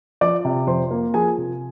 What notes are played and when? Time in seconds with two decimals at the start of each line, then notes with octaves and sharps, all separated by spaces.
0.21 F3 D5 D6
0.45 C3
0.67 F2 C5 C6
0.91 A#3
1.14 F3 G#4 G#5
1.38 C3